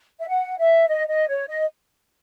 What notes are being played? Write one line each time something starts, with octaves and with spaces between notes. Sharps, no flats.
E5
F#5
E5
D#5
D#5
C#5
D#5